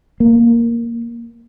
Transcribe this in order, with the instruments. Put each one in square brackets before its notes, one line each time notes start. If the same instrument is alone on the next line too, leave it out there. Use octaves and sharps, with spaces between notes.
[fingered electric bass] A#3